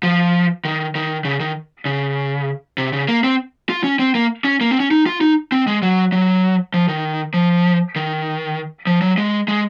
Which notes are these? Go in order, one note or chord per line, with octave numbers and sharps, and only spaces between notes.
F3
D#3
D#3
C#3
D#3
C#3
C3
C#3
A#3
C4
F4
C#4
C4
A#3
C#4
A#3
C4
C#4
D#4
F4
D#4
C4
G#3
F#3
F#3
F3
D#3
F3
D#3
F3
F#3
G#3
G#3